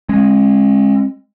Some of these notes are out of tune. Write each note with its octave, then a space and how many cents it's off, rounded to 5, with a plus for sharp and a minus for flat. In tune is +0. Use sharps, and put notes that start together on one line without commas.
G#3 -5 C#4 -40